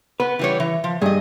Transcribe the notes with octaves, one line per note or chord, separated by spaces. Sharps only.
B3 B4
E3 G3 C#5
E3
F3
G2 G#4 D#5